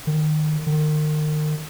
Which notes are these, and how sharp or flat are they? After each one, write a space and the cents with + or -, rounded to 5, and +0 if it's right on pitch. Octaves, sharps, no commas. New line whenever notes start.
D#3 -20
D#3 -35